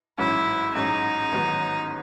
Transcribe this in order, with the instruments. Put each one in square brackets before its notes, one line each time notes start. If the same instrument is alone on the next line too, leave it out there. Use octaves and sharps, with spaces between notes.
[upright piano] A1 G#2 F#3 C#4 [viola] E4
[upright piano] A1 G#2 F#3 C#4 [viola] D#4
[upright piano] A1 G#2 D#3 F#3 B3